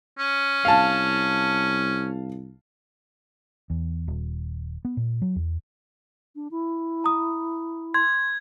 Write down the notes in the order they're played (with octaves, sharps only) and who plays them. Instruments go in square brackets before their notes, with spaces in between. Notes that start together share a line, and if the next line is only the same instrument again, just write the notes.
[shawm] C#4
[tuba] C2 [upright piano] F5 A5
[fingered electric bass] E2
D#1
B3
A#2
F#3
E2
[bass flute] D4
E4
[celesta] A#5 D#6
[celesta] C6 [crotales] G#6